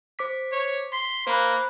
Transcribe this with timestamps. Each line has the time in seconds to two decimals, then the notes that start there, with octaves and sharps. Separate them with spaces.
0.19 C5 D6 B6
0.52 C#5
0.93 C6 B6
1.27 A#3 C5 B5 F#6